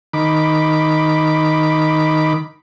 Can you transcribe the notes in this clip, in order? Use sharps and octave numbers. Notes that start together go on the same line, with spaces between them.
D#3 B5 D6